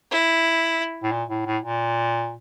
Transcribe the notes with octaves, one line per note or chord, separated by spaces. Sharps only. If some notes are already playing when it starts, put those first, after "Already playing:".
E4
A2
A#2
A2
A2
A#2